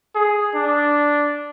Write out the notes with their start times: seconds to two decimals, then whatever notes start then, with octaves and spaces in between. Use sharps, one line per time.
0.15 G#4
0.55 D4